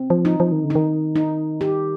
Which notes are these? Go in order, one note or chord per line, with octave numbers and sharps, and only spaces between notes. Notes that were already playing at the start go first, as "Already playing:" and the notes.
Already playing: C4
F3
D#4
F3
D#3
D3
D#4
D#3
D#4
G4